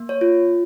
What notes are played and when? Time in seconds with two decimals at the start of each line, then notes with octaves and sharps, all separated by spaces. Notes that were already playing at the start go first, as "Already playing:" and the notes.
Already playing: A#3
0.09 C#5
0.21 F4